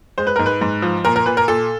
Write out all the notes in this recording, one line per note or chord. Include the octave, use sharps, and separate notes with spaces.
G#3 C5
B4
G#2 A#4
B4
G#2
F3
A#2 A#4
A#4
A#2 B4
A#4
A#2 A4